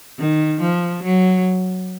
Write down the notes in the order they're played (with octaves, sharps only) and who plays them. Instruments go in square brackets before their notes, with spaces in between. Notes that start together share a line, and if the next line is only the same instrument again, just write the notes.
[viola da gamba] D#3
F3
F#3